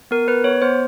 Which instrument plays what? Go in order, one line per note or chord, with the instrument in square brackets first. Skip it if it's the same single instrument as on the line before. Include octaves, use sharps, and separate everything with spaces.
[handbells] B3 A#4
B3 B4
B3 C#5
B3 C5